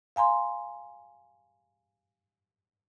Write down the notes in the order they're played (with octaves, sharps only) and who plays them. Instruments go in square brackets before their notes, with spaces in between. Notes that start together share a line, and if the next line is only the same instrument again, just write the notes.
[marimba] F5 G#5 A#5 C6